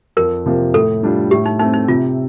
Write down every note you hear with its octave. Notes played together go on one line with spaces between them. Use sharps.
F2 A#4
C3 F3 A#3
A2 A4
G3 D4 F4
A2 G4
D#4
A3 C4 D#4
D#4
C3 F4